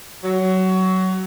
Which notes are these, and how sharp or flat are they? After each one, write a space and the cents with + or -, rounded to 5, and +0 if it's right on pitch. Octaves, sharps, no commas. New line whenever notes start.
F#3 +20